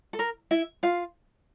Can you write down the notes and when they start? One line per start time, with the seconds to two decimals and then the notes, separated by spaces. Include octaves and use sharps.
0.13 A4
0.19 A#4
0.51 E4 E5
0.83 F4 F5